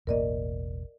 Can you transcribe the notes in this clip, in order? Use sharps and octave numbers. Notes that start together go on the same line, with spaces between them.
E1 A1 A#3 A#4 D5 D#5